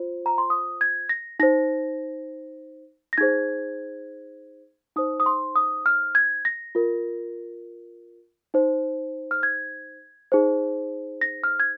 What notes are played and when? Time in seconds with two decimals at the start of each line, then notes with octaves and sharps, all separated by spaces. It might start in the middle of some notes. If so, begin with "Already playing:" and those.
Already playing: F4 C5
0.26 A#5
0.38 C6
0.50 D#6
0.81 G#6
1.09 A#6
1.39 D#4 C5 A#6
3.13 A#6
3.18 D#4 G#4 C5 G#6
4.96 D#4 C5 D#6
5.20 D#6
5.26 C6
5.56 D#6
5.86 F6
6.15 G#6
6.45 A#6
6.75 F4 A#4
8.54 D#4 C5
9.31 F6
9.43 G#6
10.32 D#4 G#4 C5
11.21 A#6
11.44 F6
11.60 G#6